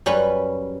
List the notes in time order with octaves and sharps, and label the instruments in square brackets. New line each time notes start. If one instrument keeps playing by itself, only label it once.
[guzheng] F#2 G3 C#4 B4 B5